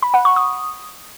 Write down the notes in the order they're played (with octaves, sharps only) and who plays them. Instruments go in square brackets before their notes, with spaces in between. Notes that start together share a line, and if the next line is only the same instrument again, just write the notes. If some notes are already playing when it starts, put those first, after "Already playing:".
[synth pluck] B5
F#5
C#6
D#6